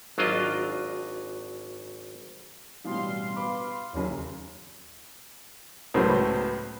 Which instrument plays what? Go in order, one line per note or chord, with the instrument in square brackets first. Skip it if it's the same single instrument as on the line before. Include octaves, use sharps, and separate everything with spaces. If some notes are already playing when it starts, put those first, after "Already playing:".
[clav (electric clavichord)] G#1 F#3 D4 F4 D#5
[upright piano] A1 B2 G3 [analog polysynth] F5 C6
[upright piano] B4 B5 D6
[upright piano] F#1 C#4 C#5 [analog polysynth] D#2
[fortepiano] C#2 A2 F#3 B3 C5